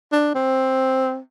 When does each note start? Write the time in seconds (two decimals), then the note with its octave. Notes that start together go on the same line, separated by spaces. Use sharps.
0.12 D4
0.34 C4